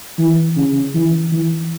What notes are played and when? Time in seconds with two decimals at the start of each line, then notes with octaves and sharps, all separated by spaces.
0.19 E3
0.56 C#3
0.95 E3
1.32 E3